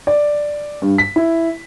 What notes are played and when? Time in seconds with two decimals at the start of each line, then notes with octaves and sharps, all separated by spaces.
0.07 D5
0.82 G2
0.98 B6
1.16 E4